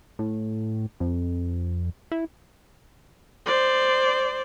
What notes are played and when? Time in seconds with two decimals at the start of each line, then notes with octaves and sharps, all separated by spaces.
0.19 A2
1.00 F2
2.12 E4
3.46 C5 D5